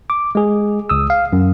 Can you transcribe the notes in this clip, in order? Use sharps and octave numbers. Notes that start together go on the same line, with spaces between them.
D6
G#3 G#4
C#2 D#6 E6
F5
F#2